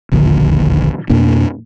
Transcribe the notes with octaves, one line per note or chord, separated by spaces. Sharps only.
E1 A#1 D#2 D3
F2 B2 A#3 D4